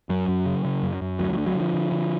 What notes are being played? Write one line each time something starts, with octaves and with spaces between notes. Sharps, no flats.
F#2 F#3
F#2
C#3
C#3
F#2
F#2
D2 F#3
F#3
D3
F#3
D3
F3
D3
D3